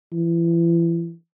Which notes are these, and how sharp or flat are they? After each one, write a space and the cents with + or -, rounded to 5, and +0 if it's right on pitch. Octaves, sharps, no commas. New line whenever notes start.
E3 +35